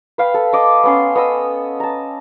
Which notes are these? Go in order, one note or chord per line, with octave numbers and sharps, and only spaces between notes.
B4 F5 G5
A4
D#5 D6
B3 C#4 C6
B3 D#5 D#6 E6
A5 A#5